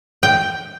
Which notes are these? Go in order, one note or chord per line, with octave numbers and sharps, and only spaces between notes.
G5